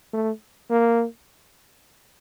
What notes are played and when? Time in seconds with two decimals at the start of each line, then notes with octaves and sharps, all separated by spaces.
0.14 A3
0.71 A#3